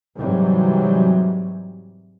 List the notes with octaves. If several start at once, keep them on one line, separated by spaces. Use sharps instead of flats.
G#2 C3 E3 F#3 G3